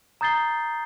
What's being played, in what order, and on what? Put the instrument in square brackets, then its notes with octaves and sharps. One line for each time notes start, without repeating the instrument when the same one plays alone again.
[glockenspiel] A#5 D#6 G6 A6 C7 G7